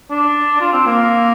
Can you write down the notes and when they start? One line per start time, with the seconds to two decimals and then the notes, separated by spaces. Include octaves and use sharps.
0.11 D4
0.60 F4
0.73 C4
0.86 A#3